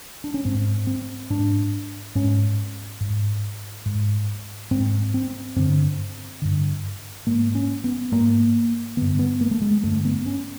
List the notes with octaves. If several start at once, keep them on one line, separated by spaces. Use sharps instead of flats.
D4
C#4
G#2 C4
C4
G#2 D4
G#2 C#4
G#2
G#2
G#2 C4
C4
G2 D3 C4
G2 D3
G#2 A#3
C#4
B3
G#2 A#3
G2 D3 B3
B3
A#3
A3
G#3
G2 D3 A3
B3
C#4